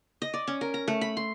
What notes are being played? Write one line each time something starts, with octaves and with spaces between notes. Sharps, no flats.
D#5
D5
C#4
A#4
A#5
A3
B5
C6